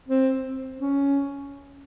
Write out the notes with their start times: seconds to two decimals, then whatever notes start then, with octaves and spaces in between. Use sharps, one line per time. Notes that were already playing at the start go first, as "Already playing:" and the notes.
0.08 C4
0.79 C#4